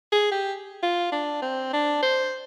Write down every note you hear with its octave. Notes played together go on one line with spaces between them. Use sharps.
G#4
G4
F4
D4
C4
D4
C5